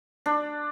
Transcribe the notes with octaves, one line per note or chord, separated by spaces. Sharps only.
D4